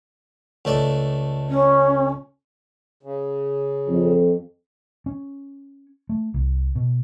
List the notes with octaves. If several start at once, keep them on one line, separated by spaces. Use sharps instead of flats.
C#2 A3 D5
C#4
C#3
F2
C#4
A3
C2
B2